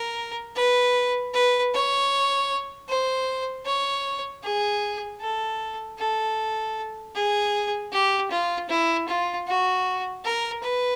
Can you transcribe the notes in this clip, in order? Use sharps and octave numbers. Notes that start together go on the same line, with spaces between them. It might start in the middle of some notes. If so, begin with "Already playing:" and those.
Already playing: A#4
B4
B4
C#5
C5
C#5
G#4
A4
A4
G#4
G4
F4
E4
F4
F#4
A#4
B4